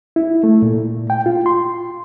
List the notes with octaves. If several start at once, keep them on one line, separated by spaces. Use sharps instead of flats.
E4
A3
A#2
G5
F4
C6